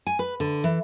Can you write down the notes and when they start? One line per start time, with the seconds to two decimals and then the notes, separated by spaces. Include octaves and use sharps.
0.07 G#5
0.19 B4
0.40 D3
0.64 E3